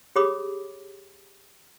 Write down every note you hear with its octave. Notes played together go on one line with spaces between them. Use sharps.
G4 G#4 C#5 B5 D6 D#6